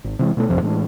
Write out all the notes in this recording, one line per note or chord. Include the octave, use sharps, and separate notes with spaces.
G#1
C3 E3 G#3
B2 G#3 A3
G1 F2 C3 F3
A2 E3 G#3 D4